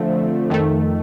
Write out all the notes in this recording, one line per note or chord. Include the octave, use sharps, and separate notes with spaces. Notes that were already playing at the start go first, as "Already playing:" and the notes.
Already playing: D3 F3 A3 C4
F2 D#3 A3